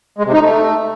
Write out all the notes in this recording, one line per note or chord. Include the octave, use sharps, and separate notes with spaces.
G#3
C3
D#4
A3